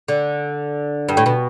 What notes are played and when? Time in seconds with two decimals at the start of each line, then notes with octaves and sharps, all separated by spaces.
0.08 D3
1.09 G2
1.17 A2
1.26 B2